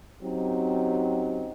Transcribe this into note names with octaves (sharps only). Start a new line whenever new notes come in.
F#3 C4 C#4 D#4 G4